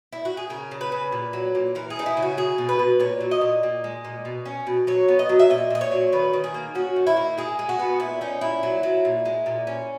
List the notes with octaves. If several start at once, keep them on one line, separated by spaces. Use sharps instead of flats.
E4
F#4
G#4
C#3 A#4
C#3
B4
C#3
A#2
F#3
A#2
E3 A#4
G#4
G#3 D#4
E4
C#3
F#4
F#3 G#4
B2
B4
B2
A#2 C#5
F#3
D#5
A#2
A#2
G#3
A#2
B2
C#4
B2
F#3 C#5
B3
D#5
F#3
E5
A#2 D#5
A#2 D#5
C#5
F#3
D#3 B4
D#3
G#4
A#3
C#4 F#4
D#3
E4
A#3
G#3 G#4
G#3
F#4
B3
A#2 E4
C#4 D#4
A#2 E4
F#3
F#3
A#2
G#3
A#2
C#4